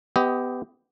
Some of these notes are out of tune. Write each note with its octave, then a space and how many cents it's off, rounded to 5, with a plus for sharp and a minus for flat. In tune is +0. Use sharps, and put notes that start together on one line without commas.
B3 +20 G4 +0 D#5 +20